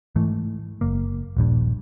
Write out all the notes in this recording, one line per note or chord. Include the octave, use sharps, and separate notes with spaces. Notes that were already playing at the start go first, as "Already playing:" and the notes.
G#2 E3 A3
F#1 A#3
D#1 A#1 G2